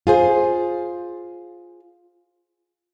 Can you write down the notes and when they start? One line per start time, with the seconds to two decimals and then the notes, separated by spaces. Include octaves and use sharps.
0.07 F4 G#4 C5